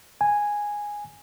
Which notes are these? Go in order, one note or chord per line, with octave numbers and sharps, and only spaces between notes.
G#5